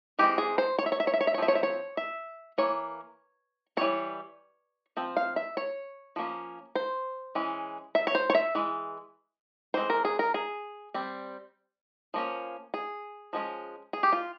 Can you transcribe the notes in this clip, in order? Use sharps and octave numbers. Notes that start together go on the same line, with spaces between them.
E3 G#3 C4 G4
G#4
C5
C#5
E5
C#5
E5
C#5
E5
C#5
E5
C#5
F3 C4 E5
C#5
E5
C#5
E5
E3 A#3 C#5
E3 G3 C4 C#5
F3 C4
F5
E5
C#5
F3 A#3 C#4
C5
E3 G#3 C#4
E5
C#5
C5
C#5
E5
E3 G#3
E3 G#3 C4 C5
A#4
G#4
A#4
G#4
G3 C4
F3 A#3 C#4
G#4
F3 G#3 C#4
G#4
G4
F4